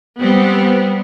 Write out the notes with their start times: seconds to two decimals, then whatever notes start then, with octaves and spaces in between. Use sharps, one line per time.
0.19 G3 B3 C4